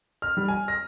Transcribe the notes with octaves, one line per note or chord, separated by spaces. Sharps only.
F6
G3
G#5
A#6